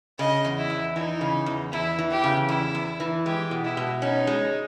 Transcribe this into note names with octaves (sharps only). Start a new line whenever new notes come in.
C#3 D#5
E2
E4
E2
E3 D#4
C#3
E2
E2 E4
E3
G4
C#3
E2 E4
E2
E3
G#3 G4
B2
E4
B2
C#4 D#4
G#3